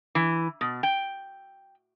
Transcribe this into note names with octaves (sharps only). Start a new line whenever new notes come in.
E3
B2
G5